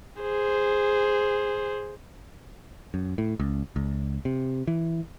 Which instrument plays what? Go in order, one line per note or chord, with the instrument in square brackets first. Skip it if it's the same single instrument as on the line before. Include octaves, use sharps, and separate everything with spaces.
[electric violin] G#4 C5
[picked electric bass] F#2
A2
C#2
C#2
C3
E3